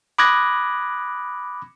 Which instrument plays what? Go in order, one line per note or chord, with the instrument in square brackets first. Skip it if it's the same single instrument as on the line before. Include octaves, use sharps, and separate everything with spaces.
[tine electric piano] B5 D6 D#6 F#6 G#6 A#6